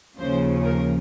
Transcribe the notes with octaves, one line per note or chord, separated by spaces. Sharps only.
D#2 C#3 F3 C5
A#4